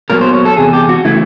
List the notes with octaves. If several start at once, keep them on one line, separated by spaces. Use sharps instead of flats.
A#2 F#3 B3 A#4
C5
C#5
A4
E2 C3 G#4
G4
F#4
C#3 E3 A3 E4